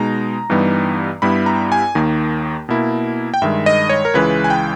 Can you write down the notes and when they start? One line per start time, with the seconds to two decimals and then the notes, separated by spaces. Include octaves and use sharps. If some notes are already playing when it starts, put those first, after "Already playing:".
Already playing: B2 G#3 D#4 A#5
0.50 G2 E3 G3 B3 D#4
1.22 G2 G3 B3 E4 B5
1.46 A#5
1.72 G#5
1.95 D#2 D#3 A#3
2.69 B2 A#3 E4
3.34 G5
3.42 G2 D#3 G#3 E5
3.66 D#5
3.89 C#5
4.05 A#4
4.14 C#2 C#3 E3 G#3 B4
4.44 G#5
4.50 G5